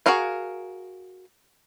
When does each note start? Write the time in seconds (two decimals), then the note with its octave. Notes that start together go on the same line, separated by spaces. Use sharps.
0.06 F#4 G#4 A#4 F5 F#5